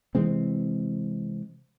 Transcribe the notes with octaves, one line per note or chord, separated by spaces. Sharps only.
C3 E3 G#3 C4